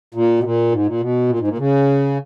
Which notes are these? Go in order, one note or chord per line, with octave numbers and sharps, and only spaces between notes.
A#2
B2
A#2
G#2
A#2
B2
A#2
G#2
A#2
C#3